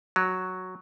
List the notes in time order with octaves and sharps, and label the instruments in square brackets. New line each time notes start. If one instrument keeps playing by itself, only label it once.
[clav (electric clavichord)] F#3